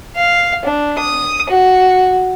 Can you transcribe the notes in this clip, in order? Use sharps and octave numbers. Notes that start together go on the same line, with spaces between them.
F5
D4
D#6
F#4